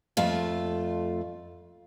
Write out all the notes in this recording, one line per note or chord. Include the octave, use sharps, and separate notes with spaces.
F2 A3 F4